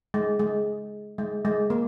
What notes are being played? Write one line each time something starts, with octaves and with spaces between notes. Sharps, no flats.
G#3
G#3
G#3
G#3
A#3